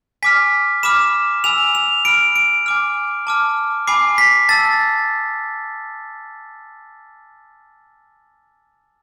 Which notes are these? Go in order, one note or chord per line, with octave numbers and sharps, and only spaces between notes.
G#5 D6 F6 B6
B5 D6 F6 E7
G#5 B5 E6 F7
F7
B5 F6 D7
D7
G#5 D6 F6
A5 D6 F6
G#5 B5 D6 C7
B6
A5 E6 A6